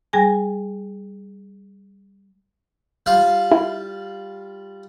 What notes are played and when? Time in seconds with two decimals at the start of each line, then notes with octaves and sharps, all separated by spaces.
0.13 G3 G#4 G#5
3.06 G3 F4 F5
3.52 E4